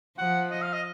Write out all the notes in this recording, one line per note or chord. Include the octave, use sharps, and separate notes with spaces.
F3 F#5
D#5
F5
D#5